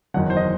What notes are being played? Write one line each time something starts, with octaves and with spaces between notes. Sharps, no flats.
F#1 E2 D#3 F#3 F#5
C5
D#5